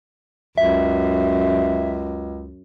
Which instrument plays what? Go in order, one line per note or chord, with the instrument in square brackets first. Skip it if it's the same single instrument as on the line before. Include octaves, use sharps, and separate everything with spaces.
[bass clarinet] C#2 [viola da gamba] F#2 [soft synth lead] E5